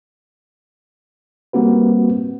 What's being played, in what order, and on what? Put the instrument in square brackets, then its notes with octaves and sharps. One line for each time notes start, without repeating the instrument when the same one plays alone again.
[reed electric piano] G3 A#3 C4 F#4 B4